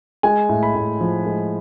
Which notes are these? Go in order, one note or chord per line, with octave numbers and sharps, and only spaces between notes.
G#3 G#5
A2
B5
A2
F3
G#3